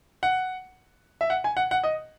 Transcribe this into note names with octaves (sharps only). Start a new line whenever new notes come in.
F#5
E5
F#5
G#5
F#5
F#5
D#5